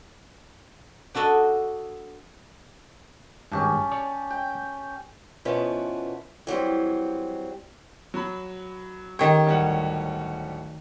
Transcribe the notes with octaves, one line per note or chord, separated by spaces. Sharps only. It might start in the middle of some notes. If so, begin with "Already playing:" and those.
D4 F#4 A4 D#5
G#1 G2 C#4 G4 A5
C#5 D5
G5
B2 F3 B3 C#4 E4 B4
E3 F#3 G3 C4
F#3 B5
D#3 G4 C#5
D1 G3 F#5